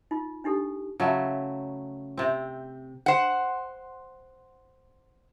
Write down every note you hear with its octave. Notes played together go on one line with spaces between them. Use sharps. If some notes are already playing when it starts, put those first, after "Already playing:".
D#4 F4
D4 D#4 G4 A4
C#3 F#3 A3 E4
C3 C4
C5 F#5